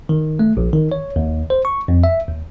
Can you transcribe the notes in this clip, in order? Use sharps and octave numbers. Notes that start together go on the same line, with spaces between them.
D#3
A3
A#1
D#3
C#5
D#2
C5
C#6
F2
E5
D#2